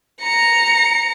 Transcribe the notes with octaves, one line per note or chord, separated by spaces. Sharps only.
A#5 C#7